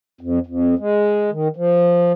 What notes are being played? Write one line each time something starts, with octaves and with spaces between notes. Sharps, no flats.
F2
F2
G#3
D#3
F3